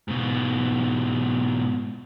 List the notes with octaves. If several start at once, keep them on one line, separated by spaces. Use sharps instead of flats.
G#2 B2